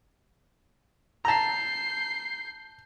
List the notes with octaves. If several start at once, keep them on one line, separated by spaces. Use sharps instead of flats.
A5 A#5 G6 C7